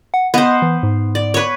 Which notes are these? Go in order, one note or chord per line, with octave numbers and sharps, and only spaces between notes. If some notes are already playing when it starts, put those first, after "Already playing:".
F#5
B3 C5 D#5
E3
G#2
D5
B4 C#5